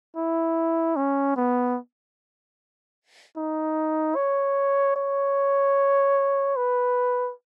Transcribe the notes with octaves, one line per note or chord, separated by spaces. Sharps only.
E4
C#4
B3
D#4
C#5
C#5
B4